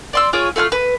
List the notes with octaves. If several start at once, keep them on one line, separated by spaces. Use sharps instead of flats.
D5 C6 E6
F4 G#4 C#5 D6
A3 F4 G#5 F6
B4